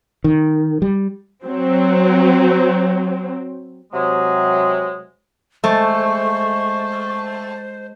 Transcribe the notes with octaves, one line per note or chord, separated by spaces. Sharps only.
D#3
G3
F#3 C4
C3 F#3 G#3
G#3 A3 C5 C#6